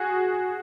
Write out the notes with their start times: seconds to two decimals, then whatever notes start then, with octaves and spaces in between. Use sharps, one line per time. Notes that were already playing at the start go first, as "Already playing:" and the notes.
Already playing: F#4 G#4